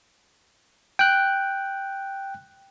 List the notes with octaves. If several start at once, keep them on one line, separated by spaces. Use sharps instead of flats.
G5 F#6